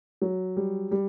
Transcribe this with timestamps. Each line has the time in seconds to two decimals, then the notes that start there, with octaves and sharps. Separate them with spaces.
0.22 F#3
0.57 G3
0.91 G3